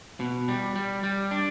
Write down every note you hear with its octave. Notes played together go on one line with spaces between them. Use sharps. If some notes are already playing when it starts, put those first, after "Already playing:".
B2
G3
G3
G3
D4